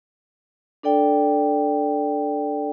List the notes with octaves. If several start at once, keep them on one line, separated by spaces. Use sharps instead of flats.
D4 A4 D5 G5